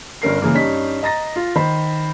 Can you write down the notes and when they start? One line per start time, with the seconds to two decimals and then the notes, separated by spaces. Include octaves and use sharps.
0.22 G1 C#4 A#4 C7
0.42 C#3 E3 G#3 A#3
0.54 G2 C#4 D#4 B6
1.03 D#5 A#5 A6 A#6
1.36 F4
1.56 D#3 C5 B5